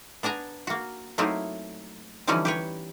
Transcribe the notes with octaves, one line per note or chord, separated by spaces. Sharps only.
B3 D4 G#5 A#5
A#3 F#4
F#3 A3 A#3 C4 D#4 E4
D3 E3 F3 G3 C#4 D#4
G4 B4 C#5